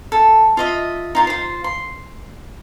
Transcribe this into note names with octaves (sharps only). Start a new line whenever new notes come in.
A4
F4 D#5 E5
D#4 F4 A#4
F4 C5
C6